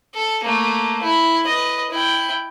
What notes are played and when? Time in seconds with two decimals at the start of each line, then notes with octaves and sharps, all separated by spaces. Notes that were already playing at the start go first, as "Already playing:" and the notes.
0.14 A4
0.44 A3 A#3
1.03 E4
1.47 B4 D#5
1.91 E4 G5